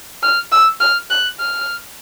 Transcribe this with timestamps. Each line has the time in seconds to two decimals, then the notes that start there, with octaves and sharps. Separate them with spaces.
0.23 F6
0.52 E6
0.80 F6
1.10 F#6
1.40 F6